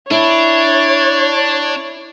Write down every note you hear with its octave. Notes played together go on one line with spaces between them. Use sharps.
D4 E4 C#5